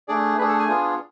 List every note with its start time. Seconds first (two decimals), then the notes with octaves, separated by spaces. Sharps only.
0.08 A3 D4 G#4 D5
0.38 A3 D4 G#4 B4
0.48 A4
0.59 G#5
0.69 B3 D4 F4 G#4